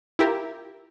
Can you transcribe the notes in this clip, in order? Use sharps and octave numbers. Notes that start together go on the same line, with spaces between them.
E4 F4 G4 A#4